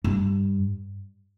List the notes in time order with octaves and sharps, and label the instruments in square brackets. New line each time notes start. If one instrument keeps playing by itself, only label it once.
[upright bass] G2